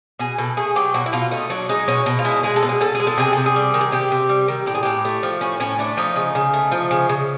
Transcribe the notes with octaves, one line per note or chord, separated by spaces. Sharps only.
B2 G#4
B2 A4
A3 G#4
F#3 G4
B2 F#4
E4
B2 F4
A3 D#4
F#3 D4
G#3 D#4
B2 C#4
B2
F4
G#3 E4
G#3 G#4
A4
B2
G#4
B2 A4
G#4
G#3
A4
C3 G#4
C3 A4
G#4
G3
D#3
G#4
C3 G4
C3
G3
D#3
A2 G4
G#4
A2 G4
A3
F3
A2 C#4
A2 C#4
A3 D4
F3 D#4
C#3
C#3
A3
F3
C#3
C#3